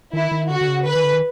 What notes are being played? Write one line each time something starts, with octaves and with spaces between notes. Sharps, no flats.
D#3 E4
D#3
D3 F#4
D3
C#3
D3 B4
D#3
D3
D#3